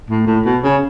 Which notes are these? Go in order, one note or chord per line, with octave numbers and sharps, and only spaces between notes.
A2
A2
B2
C#3